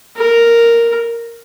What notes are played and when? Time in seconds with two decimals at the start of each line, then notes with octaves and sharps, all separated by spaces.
0.17 A#4